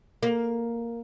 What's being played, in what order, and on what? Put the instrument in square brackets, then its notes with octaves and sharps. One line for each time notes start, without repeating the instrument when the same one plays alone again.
[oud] A#3